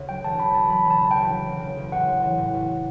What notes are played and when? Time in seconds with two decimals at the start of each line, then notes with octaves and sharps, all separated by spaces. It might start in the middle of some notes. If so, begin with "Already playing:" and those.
Already playing: D2 C#3
0.09 F#3 G5
0.24 E1 A5
0.39 C#3 B5
0.55 D2 A5
0.70 F#3 B5
0.85 E1
0.91 A5
1.01 C#3
1.11 D2 G5
1.31 F#3
1.47 E1
1.61 C#3
1.77 D2
1.92 A1 F#5
2.08 A1
2.22 E3
2.38 A2
2.54 A1